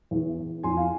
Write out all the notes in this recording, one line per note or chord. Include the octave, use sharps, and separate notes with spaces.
E2 E3
F2 G#5 C6
E3
F5 G#5